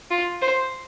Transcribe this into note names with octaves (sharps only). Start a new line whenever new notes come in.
F4
C5